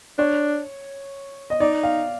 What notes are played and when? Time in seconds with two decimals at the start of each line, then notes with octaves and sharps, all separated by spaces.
0.18 D4 C#5
1.50 D#5
1.60 D#4 D5
1.83 F5